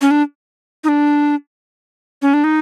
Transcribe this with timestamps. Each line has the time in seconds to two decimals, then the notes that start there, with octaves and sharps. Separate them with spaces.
0.01 C#4
0.11 D4
0.84 D#4
0.88 D4
2.22 C#4
2.34 D4
2.44 D#4